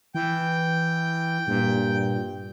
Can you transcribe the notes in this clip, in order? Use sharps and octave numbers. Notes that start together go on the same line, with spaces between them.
E3 G5
G2 A#2